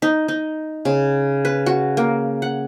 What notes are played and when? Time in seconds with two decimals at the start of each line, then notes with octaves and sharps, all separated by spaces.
0.02 D#4
0.28 D#4
0.85 C#3
1.45 B4
1.66 F#4
1.97 A#3
2.42 F#5